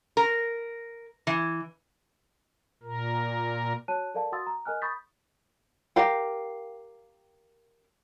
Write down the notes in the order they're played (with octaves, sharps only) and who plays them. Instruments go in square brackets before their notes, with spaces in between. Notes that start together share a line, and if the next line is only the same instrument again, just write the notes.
[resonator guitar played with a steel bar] A#4
E3
[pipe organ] A#2 A#4
[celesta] F#4 C#5 A5 F#6 D#7
A4 A#4 D5 F5 A5
F#4 F#5 C6 D#6 E6 A6
A#5
A#4 D#5 G#5 F6 F#6
B5 C#6 D#6 G6 A6 B6
[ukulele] G4 A#4 F5 G5